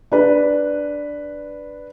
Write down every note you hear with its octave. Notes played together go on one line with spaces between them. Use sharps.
D4 B4